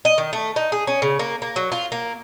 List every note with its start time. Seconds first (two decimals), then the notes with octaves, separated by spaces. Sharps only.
0.05 D#5
0.18 D#3
0.33 A3
0.56 D#4
0.72 G#4
0.87 C#4
1.02 C#3
1.19 A#3
1.42 A#3
1.56 F#3
1.72 F4
1.92 A#3